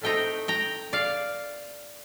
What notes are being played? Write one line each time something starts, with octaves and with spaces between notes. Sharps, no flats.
A2 A3 C4 D#4 G5 A#5
G5 A#5
D5 F5